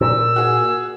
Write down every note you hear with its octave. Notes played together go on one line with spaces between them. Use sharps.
A#2 E6
F#4 G#4